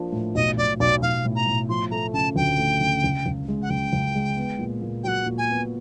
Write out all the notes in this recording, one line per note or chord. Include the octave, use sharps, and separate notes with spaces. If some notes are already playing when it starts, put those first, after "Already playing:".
Already playing: F3 A#3 D4
A2
B1 D#5
B1 D5
B1 D5
B1 F5
A2
A#5
A2
F3 C6
A3 A#5
C#3 A5
D2 G5
A3
C#3
C#2
C#2
G#3
F#5
C#2 G5
C#2
G#3
B3
A#2
A#2
F#3 F#5 G5
A#2
G#5
B3